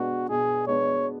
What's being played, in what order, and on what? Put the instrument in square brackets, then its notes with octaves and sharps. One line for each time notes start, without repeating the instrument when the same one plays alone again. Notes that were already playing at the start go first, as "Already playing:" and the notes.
Already playing: [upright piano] B2 G#3 B3 D4 [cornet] F#4
[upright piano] B2 [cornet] G#4
[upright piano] G#3 B3 D4 [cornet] C#5